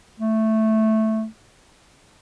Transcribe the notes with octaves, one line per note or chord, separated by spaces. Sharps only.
A3